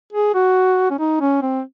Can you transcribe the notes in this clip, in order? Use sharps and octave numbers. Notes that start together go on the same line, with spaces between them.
G#4
F#4
C#4
D#4
C#4
C4